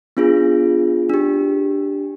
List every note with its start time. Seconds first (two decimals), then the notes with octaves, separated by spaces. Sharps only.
0.17 B3 D4 F4 G#4
1.09 D4 G4